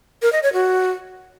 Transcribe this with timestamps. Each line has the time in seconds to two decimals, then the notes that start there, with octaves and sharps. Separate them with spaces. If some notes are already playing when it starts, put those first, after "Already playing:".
0.22 A#4
0.33 D#5
0.43 C#5
0.53 F#4